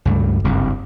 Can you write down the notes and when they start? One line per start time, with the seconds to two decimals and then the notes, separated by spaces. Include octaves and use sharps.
0.05 C#2 G2 A3
0.44 F#1 C2 G2